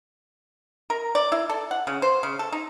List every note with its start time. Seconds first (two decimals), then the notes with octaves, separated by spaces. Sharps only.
0.90 A#4
1.15 D5
1.32 E4
1.49 A4
1.71 F#5
1.87 C#3
2.02 C5
2.23 C#3
2.39 A4
2.52 D#4